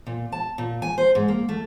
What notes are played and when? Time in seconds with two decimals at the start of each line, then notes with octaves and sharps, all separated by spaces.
0.06 A#2
0.32 A5
0.58 A#2
0.82 G#5
0.98 C5
1.15 G#2
1.28 A#3
1.49 A3